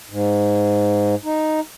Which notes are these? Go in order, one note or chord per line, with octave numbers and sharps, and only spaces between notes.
G#2
D#4